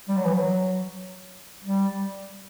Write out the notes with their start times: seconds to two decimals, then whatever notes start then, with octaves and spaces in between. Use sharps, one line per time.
0.09 G3
0.17 F#3
0.25 E3
0.33 F#3
1.64 G3